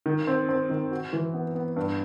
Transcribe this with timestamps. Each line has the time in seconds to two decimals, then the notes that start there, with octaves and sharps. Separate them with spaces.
0.06 D#3
0.27 C4
0.49 C4
0.70 D#3
0.91 F#4
1.13 E3
1.34 B3
1.55 B3
1.76 G2